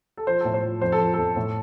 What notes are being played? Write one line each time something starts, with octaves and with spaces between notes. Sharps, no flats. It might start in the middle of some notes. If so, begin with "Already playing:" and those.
A4
F3 C5
A2 A4
C5
F3
F2 C5
A4
F3
F2 A4
A2